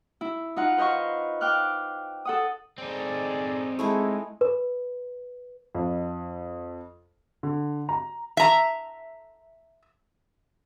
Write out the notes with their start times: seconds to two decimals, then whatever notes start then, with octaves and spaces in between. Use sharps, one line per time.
0.21 E4
0.56 D#4 F4 F#5
0.77 B4 C5 D#5 F5 C#6
1.41 F5 G5 D6 F6 F#6
2.25 A4 F#5 D#6
2.78 A3 C4 D#4 G#4 D5
3.79 G#3 A3 E4 G#4
4.41 B4
5.75 F2
7.43 D3
7.89 A#5
8.37 E5 A#5